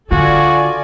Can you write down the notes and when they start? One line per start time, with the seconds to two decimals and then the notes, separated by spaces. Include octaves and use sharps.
0.11 D3 F4 F#4 A4 D5 G#5